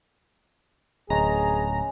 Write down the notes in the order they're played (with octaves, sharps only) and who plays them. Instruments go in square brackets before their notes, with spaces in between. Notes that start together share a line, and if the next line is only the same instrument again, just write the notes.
[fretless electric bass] D1 [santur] G#3 C#4 B4 [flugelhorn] G#4 [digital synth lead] A#5